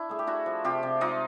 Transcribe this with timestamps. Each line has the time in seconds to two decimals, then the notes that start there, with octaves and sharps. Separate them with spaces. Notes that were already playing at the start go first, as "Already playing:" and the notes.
Already playing: D4 E4
0.09 A3 G#4
0.19 G4
0.27 D4 E4 F#4
0.46 F3
0.64 C3 F4 G4
0.83 C3
1.01 G#3 D#4 F4